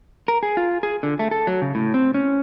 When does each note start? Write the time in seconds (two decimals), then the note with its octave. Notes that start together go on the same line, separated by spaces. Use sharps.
0.28 A#4
0.43 G#4
0.57 F4
0.83 G#4
1.03 D3
1.19 A3
1.31 A4
1.47 F#3
1.62 C#3
1.75 A2
1.94 C4
2.14 C#4